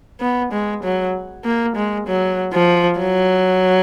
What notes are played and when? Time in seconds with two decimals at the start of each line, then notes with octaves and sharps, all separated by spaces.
0.20 B3
0.52 G#3
0.83 F#3
1.44 A#3
1.76 G#3
2.07 F#3
2.53 F3
2.99 F#3